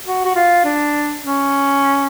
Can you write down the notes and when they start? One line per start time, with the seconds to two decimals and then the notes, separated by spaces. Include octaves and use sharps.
0.07 F#4
0.25 F#4
0.35 F4
0.64 D4
1.22 C#4